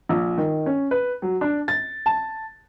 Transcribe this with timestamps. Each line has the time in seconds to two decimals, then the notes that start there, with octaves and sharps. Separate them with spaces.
0.09 A#1
0.38 D#3
0.66 C#4
0.91 B4
1.22 F#3
1.41 D4
1.68 A6
2.06 A5